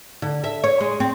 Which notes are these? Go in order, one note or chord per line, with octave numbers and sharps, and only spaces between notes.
D3
E5
C#5
G#3
C4